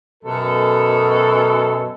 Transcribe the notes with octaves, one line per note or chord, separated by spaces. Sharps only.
F#2 B2 A4